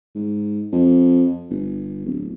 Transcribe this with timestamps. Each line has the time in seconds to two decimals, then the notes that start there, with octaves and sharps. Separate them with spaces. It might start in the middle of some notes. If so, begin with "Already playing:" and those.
0.15 G#2
0.72 F2
1.50 G1
2.05 D1